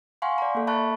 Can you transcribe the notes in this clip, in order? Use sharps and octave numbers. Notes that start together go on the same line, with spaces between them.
F5 F#5 G#5 C6 C#6
D5 A#5
A#3 A4
E5 A5 B5 C#6 F#6